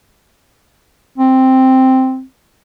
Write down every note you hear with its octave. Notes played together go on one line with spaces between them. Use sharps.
C4